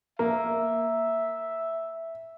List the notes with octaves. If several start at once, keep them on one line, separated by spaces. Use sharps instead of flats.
A#3 E5